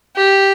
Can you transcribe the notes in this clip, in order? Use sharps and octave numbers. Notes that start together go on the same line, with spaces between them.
G4